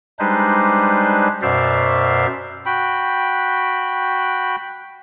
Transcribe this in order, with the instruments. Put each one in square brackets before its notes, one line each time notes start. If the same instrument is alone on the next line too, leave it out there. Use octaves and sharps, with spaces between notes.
[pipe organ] G3 G#3 D4 D#4 B4 C5
F#2 B2 C5 D5 E5 F5
[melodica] F#4 G5 B5